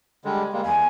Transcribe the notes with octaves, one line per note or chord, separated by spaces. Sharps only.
D3 G3 G#3
G3 G#3 A#3
E2 G#5